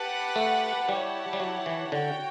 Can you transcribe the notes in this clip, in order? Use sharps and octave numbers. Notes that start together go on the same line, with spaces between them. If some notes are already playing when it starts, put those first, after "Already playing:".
Already playing: G4 B4 F#5 A5
A3
G3 E4 G4 C#5 F#5 A5
G3
F#3
E3
D3 F#4 C#5 G5